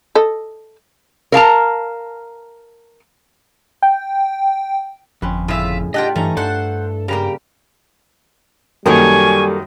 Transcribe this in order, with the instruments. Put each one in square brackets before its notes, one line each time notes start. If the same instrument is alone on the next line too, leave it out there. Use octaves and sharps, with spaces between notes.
[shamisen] A4 D#5
[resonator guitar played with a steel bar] A#4 F5 A5 A#5
[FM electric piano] G5
[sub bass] G1 [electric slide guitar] F2 [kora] C4 C#4 B4
[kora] A2 C#3 G#4 [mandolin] F4 E5
[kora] D4 F4 [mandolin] G4 F#5 G5 [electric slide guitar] D#5
[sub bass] G2 [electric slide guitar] E3 [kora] A3 C#4 D#4 [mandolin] A#5
[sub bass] G2 [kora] D4 [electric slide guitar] A4 [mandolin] C5 F#5
[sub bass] G2 [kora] C#3 G3 A#3 [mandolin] G4 A#5
[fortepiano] F#2 D#3 [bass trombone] G3 [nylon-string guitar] A#3 A4 A#4 [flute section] G#5 C#6